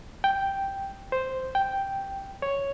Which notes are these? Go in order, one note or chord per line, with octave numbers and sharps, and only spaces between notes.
G5
C5
G5
C#5